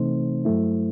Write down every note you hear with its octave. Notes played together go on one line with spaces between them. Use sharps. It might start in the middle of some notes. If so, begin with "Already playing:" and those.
Already playing: C3 E3 A3 C4 D#4 C5
G2 F#3 A3 E4